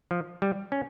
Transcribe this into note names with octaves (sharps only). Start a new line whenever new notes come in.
F3
G3
C#4